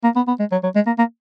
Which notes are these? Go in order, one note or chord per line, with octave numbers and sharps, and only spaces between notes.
A#3
B3
B3
G#3
F#3
F#3
G#3
A#3
A#3